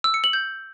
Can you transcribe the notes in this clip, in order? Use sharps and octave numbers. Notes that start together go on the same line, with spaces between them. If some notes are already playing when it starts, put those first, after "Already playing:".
E6
C#7
F#7
G6